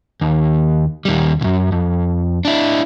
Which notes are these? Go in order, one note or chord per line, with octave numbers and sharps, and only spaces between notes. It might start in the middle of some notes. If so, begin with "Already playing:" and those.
D#2
D#2 G3
C2 F#2
F2
D4 E4